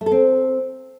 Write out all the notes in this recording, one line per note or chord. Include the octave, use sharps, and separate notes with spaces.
A3
A4
C4